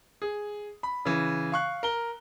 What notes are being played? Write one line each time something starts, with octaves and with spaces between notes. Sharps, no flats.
G#4
B5
C#3 E3
F5 C#6 F#6
A#4 G7